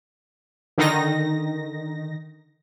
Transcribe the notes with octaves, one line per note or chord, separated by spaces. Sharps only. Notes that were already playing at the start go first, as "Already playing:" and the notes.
D3 D#3 D#4 A#6